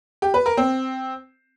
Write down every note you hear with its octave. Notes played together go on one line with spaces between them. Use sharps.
G4
B4
A#4
C4